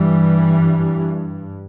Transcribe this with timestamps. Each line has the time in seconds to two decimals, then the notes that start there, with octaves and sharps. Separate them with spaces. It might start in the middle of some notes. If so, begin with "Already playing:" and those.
Already playing: G2 E3 G3